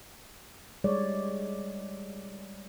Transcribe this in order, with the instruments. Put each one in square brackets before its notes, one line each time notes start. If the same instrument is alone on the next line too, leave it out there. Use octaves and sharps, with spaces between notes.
[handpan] G3 G#3 C#5 D5